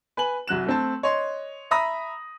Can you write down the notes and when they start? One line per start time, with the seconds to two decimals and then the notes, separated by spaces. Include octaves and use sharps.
0.17 B4 G#5 F#7
0.47 C2 F#3 F#6 E7
0.66 A3 C4 A5
1.03 C#5 D#5 C6
1.71 E5 A#5 B5 D#6 A#6